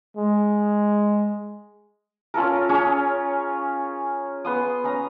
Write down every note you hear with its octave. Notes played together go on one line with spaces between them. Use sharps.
G#3
C#4 F4 A4 A#4
C#4 G#4 C#5
B3 C6 D#6
C#4 A#5